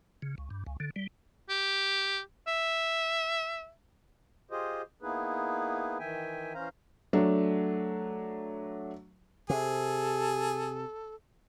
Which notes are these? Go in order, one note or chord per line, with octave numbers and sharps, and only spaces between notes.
C#3
C#2
G2
C#2
D3
G3
G4
E5
F4 G4 G#4 C5 D#5
A#3 B3 D#4 E4 G#4 B4
D#3 E3 E5 G5 G#5
E3 C#4 C5 F5 A#5
F#3 A3 D4
C3 G#4 A4